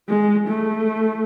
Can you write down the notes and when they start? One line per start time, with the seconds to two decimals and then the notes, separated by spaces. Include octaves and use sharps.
0.09 G#3
0.48 A3